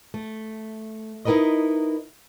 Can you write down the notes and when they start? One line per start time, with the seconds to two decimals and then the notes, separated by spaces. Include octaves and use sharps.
0.14 A3
1.25 D#4 E4 F#4 A#4 B4 D#5